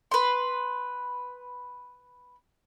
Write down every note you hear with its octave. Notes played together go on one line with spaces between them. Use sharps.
B4 C6